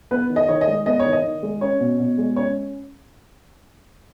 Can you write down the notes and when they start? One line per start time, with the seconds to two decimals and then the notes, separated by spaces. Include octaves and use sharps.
0.11 B3 B4
0.30 D#3
0.36 D#5
0.48 D#3 C#5
0.61 D#5
0.67 G#3
0.86 B3 D#5
1.00 C#5
1.05 D#3
1.12 D#5
1.24 D#3
1.43 G#3
1.61 C#4 C#5
1.80 B2
1.99 B2
2.18 G#3
2.36 C#4 C#5